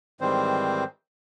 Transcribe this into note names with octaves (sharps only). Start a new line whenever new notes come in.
G#2 D#3 E3 G3 C4 C5